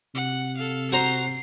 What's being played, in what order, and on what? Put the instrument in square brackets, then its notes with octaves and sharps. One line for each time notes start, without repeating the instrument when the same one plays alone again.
[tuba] C3 [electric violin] F#5
[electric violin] A4 F5
[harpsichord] F#4 C5 A#5 [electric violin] C7